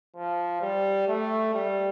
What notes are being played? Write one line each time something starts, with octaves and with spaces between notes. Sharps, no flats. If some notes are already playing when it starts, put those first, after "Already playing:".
F3
G3
A3
G3